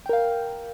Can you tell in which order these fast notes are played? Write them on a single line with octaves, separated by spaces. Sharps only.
G5 A#4 F5